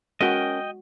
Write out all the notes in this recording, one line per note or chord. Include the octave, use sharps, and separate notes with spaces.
G#3 C#4 F#4 A#4 B4 D#5 G5